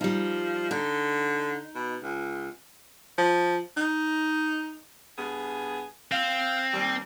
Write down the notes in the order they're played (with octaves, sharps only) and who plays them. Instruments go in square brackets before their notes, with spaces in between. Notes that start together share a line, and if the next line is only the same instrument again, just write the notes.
[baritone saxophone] F3 [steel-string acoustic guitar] G3 D#4
[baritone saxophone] D3 [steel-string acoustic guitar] D#4
[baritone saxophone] B2
C#2
F3
D#4
[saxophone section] G2 B3 G#4
[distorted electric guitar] C4 [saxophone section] F5
[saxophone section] D#2 G3